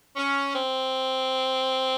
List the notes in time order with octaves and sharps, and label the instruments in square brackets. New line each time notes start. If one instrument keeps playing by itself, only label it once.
[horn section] C#4
C4